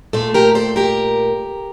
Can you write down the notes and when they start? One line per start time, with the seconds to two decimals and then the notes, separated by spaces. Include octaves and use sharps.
0.13 A#2 A3 A4 C5
0.34 G4 A#4
0.55 A4 C5
0.76 G4 A#4